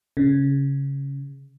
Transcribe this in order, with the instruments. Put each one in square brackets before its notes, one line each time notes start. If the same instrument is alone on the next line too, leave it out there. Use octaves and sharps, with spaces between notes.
[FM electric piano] C#3